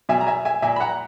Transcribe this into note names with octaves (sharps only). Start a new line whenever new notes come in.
B2 E5 G#5
A#5
E5 G#5
E5 G#5
A#2 E5 G#5
B5
F#5 A#5